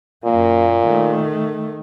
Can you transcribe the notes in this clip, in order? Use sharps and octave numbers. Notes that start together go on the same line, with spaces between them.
F#2 A#2 A#3
D#3 A3